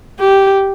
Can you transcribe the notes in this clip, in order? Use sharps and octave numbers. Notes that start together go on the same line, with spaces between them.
G4